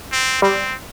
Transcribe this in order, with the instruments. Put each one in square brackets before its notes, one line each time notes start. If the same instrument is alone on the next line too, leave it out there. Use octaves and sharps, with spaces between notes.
[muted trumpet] C4
[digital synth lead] G3 [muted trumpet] C4